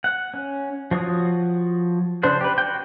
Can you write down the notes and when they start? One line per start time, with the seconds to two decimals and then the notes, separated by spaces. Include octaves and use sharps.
0.04 F#5
0.34 C#4
0.91 F3 F#4 C#5 D#6
2.23 C#3 D4 C5 F#5
2.41 G4 B4
2.58 F#4 G5